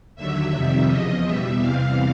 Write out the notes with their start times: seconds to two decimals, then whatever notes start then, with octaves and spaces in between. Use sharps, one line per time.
0.16 D#2 D3 F#3 E5
0.52 F2 C3 D#3 G3 E5
0.89 E2 C#3 F3 D#5
1.25 E2 B2 G3 E5
1.60 E2 C3 E3 G3 F5